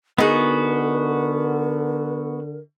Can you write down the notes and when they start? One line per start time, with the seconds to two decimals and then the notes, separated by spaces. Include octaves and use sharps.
0.18 D3 B3 D#4 F#4 G#4 A#4